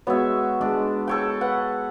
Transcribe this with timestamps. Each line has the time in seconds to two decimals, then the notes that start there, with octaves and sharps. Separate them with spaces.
0.07 G#3 B3 F#4 C#5 E5
0.61 G#3 D4
1.08 A4 C#5 G5
1.41 B4 F#5